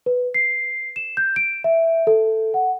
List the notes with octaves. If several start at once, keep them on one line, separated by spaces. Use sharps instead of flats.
B4
C7
E7
G6
D7
E5
A4
F#5